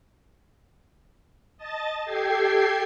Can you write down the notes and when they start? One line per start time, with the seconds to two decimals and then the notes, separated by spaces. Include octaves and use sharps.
1.58 D#5 A5 A6
2.05 G4 A4 G5 G#6 C7